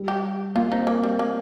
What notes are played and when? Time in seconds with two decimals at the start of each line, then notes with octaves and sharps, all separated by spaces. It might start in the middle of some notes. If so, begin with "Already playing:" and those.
Already playing: G3
0.08 G4
0.55 A#3 F4
0.71 C4 D#4
0.87 A#3 A#4
1.03 G3
1.19 A#3